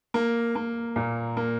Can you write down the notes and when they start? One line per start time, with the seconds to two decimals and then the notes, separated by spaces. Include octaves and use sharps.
0.14 A#3
0.55 A#3
0.96 A#2
1.37 A#3